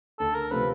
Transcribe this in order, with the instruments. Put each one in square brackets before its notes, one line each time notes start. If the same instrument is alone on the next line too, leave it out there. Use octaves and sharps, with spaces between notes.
[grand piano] D2 [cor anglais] A4
[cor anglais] A#4
[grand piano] C3 F3 A3 C4 [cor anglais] B4